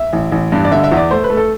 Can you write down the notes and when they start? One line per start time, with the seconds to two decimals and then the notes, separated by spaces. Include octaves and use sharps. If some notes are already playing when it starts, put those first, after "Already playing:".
Already playing: E5
0.13 A1
0.32 A1
0.52 G2
0.65 D5
0.71 D3 E5
0.84 E5
0.92 E2
0.97 D5
1.11 A3 C5
1.24 B4
1.30 A3
1.37 A4